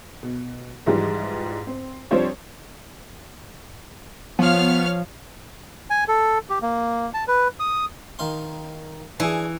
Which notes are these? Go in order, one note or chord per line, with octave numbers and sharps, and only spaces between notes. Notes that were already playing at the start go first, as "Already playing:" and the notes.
B2
G#2 E3 F3 G3
C4
F3 G3 C4 D4 C5 C#5
F3 B3 C#5 F5 F6
G#5
A4
G4
A#3
A5
B4
D#6
D#3 F5 C6
E3 D4 G#4